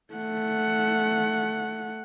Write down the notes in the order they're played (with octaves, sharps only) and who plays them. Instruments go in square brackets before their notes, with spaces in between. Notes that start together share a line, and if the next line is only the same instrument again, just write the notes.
[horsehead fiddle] A3 F#5